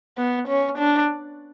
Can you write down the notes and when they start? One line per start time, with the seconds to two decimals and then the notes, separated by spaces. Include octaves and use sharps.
0.18 B3
0.48 C#4
0.78 D4